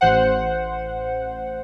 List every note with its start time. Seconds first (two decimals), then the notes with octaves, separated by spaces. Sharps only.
0.01 A1 C5 F#5